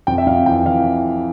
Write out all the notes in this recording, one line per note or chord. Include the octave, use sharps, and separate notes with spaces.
F2 G5
E5
F2 F5
E3 G5
E3 F5